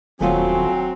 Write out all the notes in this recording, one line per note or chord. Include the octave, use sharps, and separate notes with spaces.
D#1 F#3 A3 C4 F4 C#5 G#5